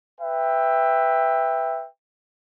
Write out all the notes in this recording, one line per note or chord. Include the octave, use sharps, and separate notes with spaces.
B4 E5 G5